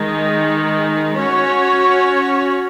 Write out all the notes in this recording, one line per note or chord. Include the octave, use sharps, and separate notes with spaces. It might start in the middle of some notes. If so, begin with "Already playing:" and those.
Already playing: D#3 G#3 D#4
C#4 F#4 C#5